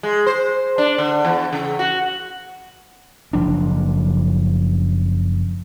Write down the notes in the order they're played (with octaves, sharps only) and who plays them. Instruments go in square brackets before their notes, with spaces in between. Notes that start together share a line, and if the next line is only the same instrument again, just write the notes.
[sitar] G#3
C5
D4
D3
E2
C#3
F#4
[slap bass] F#1 F3 D4